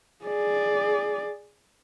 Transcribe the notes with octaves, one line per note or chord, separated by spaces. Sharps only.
G#4 D5